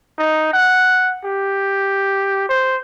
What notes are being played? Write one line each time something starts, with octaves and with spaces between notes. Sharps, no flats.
D#4
F#5
G4
C5